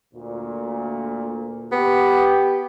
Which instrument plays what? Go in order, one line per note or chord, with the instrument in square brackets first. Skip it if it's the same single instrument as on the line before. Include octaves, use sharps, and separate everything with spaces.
[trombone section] D2 A#2
[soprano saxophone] B3 [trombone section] G4